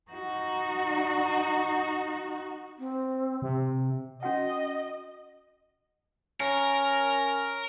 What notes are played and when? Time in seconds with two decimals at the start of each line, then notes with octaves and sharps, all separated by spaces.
0.11 D#4 F#4
2.79 C4
3.42 C3
4.23 C#4 F#4 D#5 F#5
6.40 C#4 A#4